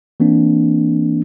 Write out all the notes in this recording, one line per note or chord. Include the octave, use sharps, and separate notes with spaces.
E3 A#3 C4 D4